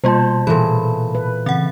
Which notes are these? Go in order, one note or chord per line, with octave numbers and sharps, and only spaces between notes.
B2 G3 A#3 F4 C5 A5
A#2 E3 G#4 A4 B5
B4
C#3 E3 C4 F#5 A6